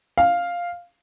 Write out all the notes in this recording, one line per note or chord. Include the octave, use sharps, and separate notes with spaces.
F5